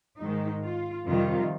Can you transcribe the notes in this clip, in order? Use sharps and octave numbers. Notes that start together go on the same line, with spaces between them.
G#2 D#3 G#3 D#4
F4
F2 C3 D#3 G3 F4